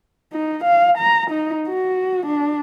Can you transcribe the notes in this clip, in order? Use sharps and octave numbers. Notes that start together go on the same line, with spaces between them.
D#4
F5
A#5
D#4
F#4
D4